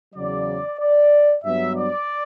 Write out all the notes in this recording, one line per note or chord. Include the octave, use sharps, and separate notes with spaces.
E2 C#3 F#3 D5
D5
G2 F#3 B3 E5
D5